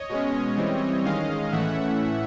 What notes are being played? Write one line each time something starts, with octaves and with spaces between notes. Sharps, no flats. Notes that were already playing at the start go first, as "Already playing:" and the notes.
Already playing: C#5 D#5
B2 G#3 C#4
E3 G3 C4
D#3 G#3 C#4 D#5 F5
A2 E3 A3 C#4 E5 F#5